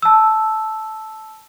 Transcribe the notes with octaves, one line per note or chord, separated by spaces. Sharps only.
A5 E6